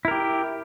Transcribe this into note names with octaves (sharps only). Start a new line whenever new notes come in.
E4 G4 A#4